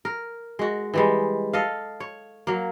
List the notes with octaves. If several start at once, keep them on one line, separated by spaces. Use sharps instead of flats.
A#4
G#3 F#4
E3 G3 G#3
A4 D#5 F5
C#5
F#3 A#3